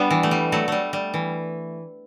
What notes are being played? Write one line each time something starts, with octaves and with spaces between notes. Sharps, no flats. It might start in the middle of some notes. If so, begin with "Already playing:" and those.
Already playing: G3 B3 D4
E3
A3
G3
F#3 A3
G3 A3
G3
E3